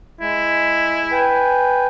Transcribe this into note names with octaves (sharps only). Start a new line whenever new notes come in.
G#3 E4
B4 G5 G#5